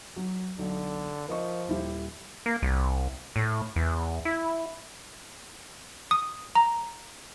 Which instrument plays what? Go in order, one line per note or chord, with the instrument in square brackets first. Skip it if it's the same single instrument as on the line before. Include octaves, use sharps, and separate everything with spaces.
[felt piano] F#3
[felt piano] B1 [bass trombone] D3
[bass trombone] F3 [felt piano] A#4 D#5 C#6
[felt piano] D#1 E4 G4
[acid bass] A#3
C2
A2
E2
E4
[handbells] D#6
A#5